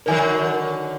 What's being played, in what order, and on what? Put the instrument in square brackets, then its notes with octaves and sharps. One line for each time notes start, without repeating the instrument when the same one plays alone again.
[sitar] D3 D#3 F#3 [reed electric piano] A#4 G#5